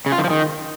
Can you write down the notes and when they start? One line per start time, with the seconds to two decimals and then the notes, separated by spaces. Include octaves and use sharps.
0.06 C#3
0.12 F4
0.18 D#3
0.24 F3
0.30 D#3